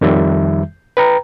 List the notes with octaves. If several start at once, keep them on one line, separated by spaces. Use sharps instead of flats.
F2 D#3 G3 E5
B4 G5 A#5